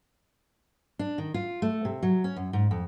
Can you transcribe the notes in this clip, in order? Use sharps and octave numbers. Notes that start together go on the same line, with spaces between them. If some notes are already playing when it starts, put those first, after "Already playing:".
D4
D#3
F4
A3
C3
F#3
C#4
F#2
G#2
F2